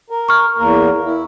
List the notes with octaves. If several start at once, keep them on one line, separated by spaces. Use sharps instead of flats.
A#4
C#6 F6
E2 A#3 A#4
E4